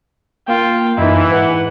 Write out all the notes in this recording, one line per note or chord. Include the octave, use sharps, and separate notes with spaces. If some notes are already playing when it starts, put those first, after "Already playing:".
A#3 F4 G5
F#2 E3 D#4 E4
G#2 B4 F#5